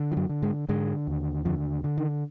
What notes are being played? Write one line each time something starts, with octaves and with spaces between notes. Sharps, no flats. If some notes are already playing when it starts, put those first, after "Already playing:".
Already playing: D3
F3
F#2 F#3
D3
G#2 G#3
G#2 D3 G#3
D#2
F2 D3 F3
D3
D#3